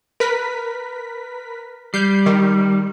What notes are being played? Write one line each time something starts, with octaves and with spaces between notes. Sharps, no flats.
A#4 B4 B6
G3 G6 C7
D#3